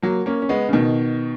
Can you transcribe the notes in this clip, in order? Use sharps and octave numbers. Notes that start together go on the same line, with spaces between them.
F#3 A#3
A#3 C#4
C#4
G#3 B3
C#3
B2 D#3